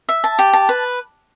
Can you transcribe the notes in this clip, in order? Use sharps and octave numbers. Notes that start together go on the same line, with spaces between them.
E5
A5
G4
A5
B4